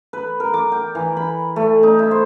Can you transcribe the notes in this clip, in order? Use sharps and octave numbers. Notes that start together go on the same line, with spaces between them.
B4
A#4
D6
G5
E3
B5
A3
D#4
E4
C5